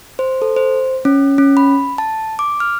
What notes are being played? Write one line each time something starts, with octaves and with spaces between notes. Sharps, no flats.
C5
A4
C5
C#4
C#4
B5
A5
D6
F6